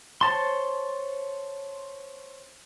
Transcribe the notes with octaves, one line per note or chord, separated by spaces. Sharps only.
C5 C#5 A5 C6